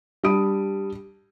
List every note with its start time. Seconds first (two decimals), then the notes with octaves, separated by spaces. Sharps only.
0.24 G3 D4 B5 D#6 D7